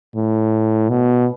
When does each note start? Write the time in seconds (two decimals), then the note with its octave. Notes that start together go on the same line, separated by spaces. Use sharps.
0.15 A2
0.89 B2